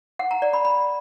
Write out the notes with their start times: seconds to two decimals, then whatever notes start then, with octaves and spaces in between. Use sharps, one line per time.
0.19 F#5
0.31 A#5
0.42 D5
0.53 B5
0.65 B5